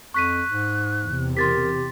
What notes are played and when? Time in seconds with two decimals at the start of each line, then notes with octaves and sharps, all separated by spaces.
0.14 F2 C#6 F#6 B6 D#7
0.50 G#2
1.03 E2 C3
1.37 G4 A#4 C6 A6 B6